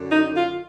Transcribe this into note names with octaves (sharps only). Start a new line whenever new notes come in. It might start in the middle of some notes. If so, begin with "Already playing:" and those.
Already playing: F#2 D3
D#4
F4